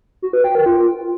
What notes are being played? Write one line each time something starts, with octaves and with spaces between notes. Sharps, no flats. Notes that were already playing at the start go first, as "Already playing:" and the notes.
F#4
B4
G5
A#4
F4